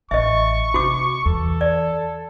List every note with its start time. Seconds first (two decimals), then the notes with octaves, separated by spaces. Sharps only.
0.11 A1 D#5 E5 C#6
0.74 C3 F#4 D6
1.26 E2 A4
1.61 D5